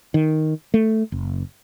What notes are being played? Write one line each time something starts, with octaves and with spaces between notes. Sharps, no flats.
D#3
A3
F#1